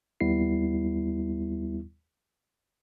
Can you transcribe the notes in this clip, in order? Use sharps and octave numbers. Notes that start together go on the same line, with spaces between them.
D#2 G3 B3 E4 C7